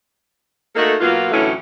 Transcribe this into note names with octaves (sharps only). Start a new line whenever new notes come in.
A3 A#3 D#4 F#4 A4
B2 F#3 A#3 B3 F4
D2 A2 E3 F#3 A3 C#4